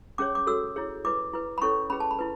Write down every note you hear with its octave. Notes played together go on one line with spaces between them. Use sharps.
C#4 G#4 C#5 D6
D6
F#4 A4 C#5 E6
E4 G#4 C#5
E4 B4 D6
E4 B4
B5
C#4 E4 A4 C#5 C#6
C#4 G#4 B4 B5
A5
B5
E4 B4